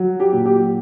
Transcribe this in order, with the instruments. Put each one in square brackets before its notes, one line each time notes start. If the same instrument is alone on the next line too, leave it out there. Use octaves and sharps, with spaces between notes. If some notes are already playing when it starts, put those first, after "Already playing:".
Already playing: [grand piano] F#3
G4
A#2
G4